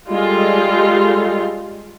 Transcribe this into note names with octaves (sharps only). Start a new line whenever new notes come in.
G3 G#3 F4 A4